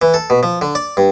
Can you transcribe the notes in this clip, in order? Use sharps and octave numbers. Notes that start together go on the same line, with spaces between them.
E3
A4
B2
F3
D3
D5
G2